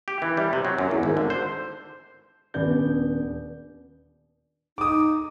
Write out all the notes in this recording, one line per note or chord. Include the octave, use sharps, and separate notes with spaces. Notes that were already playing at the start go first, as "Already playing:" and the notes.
G4
E3
G3
C3
F#3
F#2
E2
G#1
D3
C5
D#1 B3 D4 D5 G6
D#4 D6 D#6